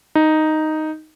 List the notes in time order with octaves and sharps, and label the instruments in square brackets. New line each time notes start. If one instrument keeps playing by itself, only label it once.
[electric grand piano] D#4